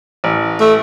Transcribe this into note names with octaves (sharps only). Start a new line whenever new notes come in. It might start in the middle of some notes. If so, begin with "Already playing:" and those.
A1
A3